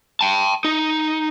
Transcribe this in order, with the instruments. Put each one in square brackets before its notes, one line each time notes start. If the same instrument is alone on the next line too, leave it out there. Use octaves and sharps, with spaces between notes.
[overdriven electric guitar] G5 A5
D#4